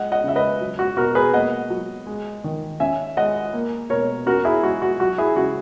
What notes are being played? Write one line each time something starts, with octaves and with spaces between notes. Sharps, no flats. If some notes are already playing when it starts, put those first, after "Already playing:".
Already playing: G#3 D#5 F#5
D#5 F#5
C#3 E5
B4 D#5
F#3
F#4
B2 F#4 A#4
G#4 B4
A#3 D#5 F#5
F#3
G#3
D#3
C#4 E5 G#5
G#3 D#5 F#5
A#3
B2 A#4 C#5
C#4 F#4 A#4
E4 G#4
G#3 F#4
F#4
F#3 F#4
E4 G#4
C#3 F#4